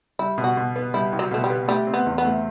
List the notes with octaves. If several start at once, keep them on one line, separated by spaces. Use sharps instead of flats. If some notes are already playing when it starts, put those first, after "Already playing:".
G3 E4
B2
F#4
B2
B3
G3 E4
C2
F#3
B2 A3
G3
B3
G3 A3
C4
B3
E2
B3
A3